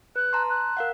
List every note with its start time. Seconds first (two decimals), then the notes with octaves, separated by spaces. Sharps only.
0.16 B4 F#6
0.33 A5 A#5 C6
0.50 F#6
0.77 A#4 F5 F#5